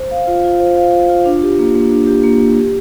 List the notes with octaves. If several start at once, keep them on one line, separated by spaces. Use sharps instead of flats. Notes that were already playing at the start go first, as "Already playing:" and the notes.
Already playing: C5
F5
F4
F4
C5
F5
F4
F4
D4
G4
A#3
A#3
D4
G4
A#3
A#3
G4